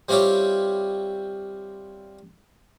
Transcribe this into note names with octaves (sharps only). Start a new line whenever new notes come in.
G3 C4 E4 F4 G4 C#5